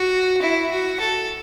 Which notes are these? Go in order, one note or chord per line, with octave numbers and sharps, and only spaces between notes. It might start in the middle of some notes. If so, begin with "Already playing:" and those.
Already playing: F#4
E4
F#4
A4